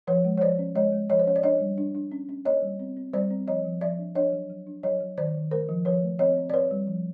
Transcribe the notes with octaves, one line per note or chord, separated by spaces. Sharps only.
F3 B4 C#5
G#3
C#5
F3 C5 D5
C#4
G#3 C#5 D#5
G#3
F3 C#5 D#5
C5
C#4 C#5
D5
D4 C#5 D#5
G3
D4
D4
C#4
C#4
A#3 C#5 D#5
G3
C4
C4
G3 C5 D5
C4
F3 C#5 D#5
F3
F3 D5 E5
D4
D4 C#5 D#5
F#3
F#3
D4
F#3 C#5 D#5
F#3
D#3 C5 D5
D#3
A3 A#4 C5
F3
F3 B4 C#5
A3
C4 C#5 D#5
C4
D5
C4 B4 C#5
G3
F3